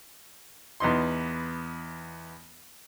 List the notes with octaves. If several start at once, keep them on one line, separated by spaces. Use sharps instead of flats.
E2 B3 D#4 C6